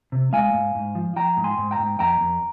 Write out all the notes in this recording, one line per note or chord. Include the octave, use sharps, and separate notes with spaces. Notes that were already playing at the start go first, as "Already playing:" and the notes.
C3
G#3 F5 G#5
G#2
G#2
F3
F3 G5 A#5
G#2
G#5 C6
G#2
G5 A#5
G#2
F2 G5 A#5
F2